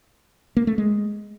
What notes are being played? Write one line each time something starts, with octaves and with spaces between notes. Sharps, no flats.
A#3
A3
G#3